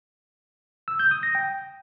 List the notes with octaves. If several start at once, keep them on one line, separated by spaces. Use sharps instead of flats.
E6
G6
D#6
A#6
G5